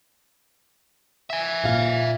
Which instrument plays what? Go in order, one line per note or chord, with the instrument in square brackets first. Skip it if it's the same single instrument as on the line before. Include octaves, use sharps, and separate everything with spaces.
[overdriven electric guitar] E5 G#5
[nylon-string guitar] A#2 F5